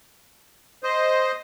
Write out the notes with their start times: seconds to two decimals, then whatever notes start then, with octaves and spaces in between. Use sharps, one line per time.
0.83 C5 D#5